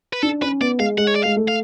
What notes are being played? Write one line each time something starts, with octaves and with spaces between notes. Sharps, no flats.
B4
D4 A4
C#4 B4
B3 D5
G#3 F5
G#3 F#5
C#5
D5
G#3 F5
A3
F5